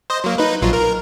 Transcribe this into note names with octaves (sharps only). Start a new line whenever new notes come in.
C5 D#5
F#3 A#3
D#4 B4
A#1 F#3 F4
A#4